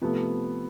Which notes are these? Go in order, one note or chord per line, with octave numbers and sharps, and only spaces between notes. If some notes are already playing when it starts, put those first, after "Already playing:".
C3 F3 A3 B3